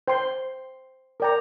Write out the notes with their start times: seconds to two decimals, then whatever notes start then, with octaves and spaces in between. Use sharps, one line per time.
0.08 C5 G5 C6
1.20 A#4 D5 G5 A#5